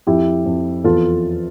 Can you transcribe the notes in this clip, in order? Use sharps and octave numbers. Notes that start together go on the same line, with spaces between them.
F2 E4 G4
F2
E2 F4 A4